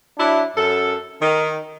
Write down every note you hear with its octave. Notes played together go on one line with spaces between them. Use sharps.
F#3 D4 E4
F#2 A4
D#3